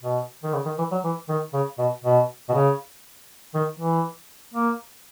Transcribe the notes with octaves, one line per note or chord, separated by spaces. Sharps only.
B2
D#3
C#3
D#3
E3
F#3
E3
D#3
C#3
B2
B2
B2
C#3
D#3
E3
A#3